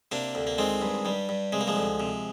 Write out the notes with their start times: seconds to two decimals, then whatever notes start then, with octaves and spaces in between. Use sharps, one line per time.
0.12 C3 A#3 D4
0.35 D2
0.47 A#3
0.58 D#3 G#3 C4
0.82 G2
1.05 G2 G3
1.29 G2
1.52 C3 G#3
1.61 A#3
1.67 F3 G#3
1.76 D2
2.00 C3